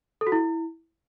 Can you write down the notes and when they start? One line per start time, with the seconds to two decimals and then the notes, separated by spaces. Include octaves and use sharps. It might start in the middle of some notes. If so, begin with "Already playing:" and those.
0.21 A4
0.27 F#4
0.32 E4